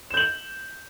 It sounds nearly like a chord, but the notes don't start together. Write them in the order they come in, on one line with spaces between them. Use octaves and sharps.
E7 G6 F#7